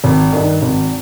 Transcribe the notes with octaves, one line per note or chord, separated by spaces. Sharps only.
G#1
G2 D#3
G#1